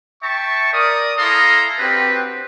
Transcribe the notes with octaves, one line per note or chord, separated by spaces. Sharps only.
E5 G5 A5 C#6
A#4 D5 D#6
E4 A4 F5 A#5 C6 D#6
C4 D4 F#4 G4 B4